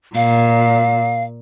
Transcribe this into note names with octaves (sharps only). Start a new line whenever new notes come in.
A#2 F5